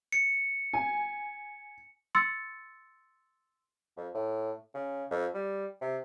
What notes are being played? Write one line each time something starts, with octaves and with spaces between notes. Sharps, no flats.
C#7
G#5
C6 E6 A6 C#7
F2
A2
C#3
F2
G3
C3